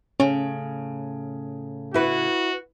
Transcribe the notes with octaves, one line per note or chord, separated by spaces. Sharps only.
A2 C#3 C#4
E4 F#4 B4